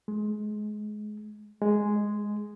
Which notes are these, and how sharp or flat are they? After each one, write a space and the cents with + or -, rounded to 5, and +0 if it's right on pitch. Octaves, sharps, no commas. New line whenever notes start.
G#3 +25
G#3 +0